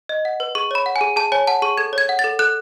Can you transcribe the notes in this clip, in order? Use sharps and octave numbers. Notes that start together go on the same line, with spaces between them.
D#5
F#5
B4
G#4 C#6
C#5 B5
F#5
G#5
G#4
G#4 A5
C#5 G#5
F#5 A5
G#4 C#6
A4 G#6
C#5 G#6
F#5
A6
A4
A4 F#6